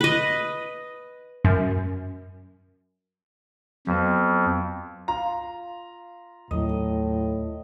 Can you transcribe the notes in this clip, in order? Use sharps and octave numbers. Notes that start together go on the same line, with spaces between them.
B4 D#5
F#2
F2 F#3 B3
F4 A#5
D#2 A2 F#3 D#5